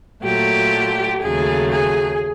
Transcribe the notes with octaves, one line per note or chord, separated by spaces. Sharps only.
A#2 F#3 A3 G4
D#2 C#3 F#3 A3 G#4
G#4